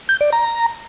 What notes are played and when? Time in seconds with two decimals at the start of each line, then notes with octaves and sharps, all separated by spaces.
0.09 G6
0.21 D5
0.32 A#5